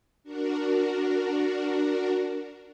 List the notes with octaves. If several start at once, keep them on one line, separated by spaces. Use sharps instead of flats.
D4 F#4 A#4